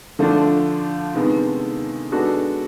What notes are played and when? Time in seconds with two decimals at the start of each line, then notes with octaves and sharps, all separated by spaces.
0.19 D3 F3 A3 D4 F4
1.15 C3 D#3 G#3 B3
2.12 G#3 B3 D4 F#4 A4